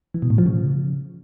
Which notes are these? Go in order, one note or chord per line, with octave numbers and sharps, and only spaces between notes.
E3
B2
A2
F3
C#3